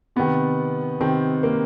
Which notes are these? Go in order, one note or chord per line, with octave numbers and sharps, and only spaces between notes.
C3 D#3 B3
C3 D#3 C4
A#3